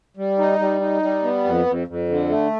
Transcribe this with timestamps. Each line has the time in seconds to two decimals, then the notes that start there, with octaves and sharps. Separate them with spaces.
0.17 G3
0.38 D#4
0.59 G3
0.80 D#4
1.02 G3
1.23 B3
1.45 F2
1.66 F2
1.87 F2
2.09 D3
2.29 A3